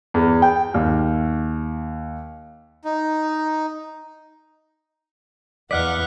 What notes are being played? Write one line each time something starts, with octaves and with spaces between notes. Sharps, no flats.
E2
G5
D#2
D#4
E2 D5 D#5 F5 F#5 F6 F#6 B6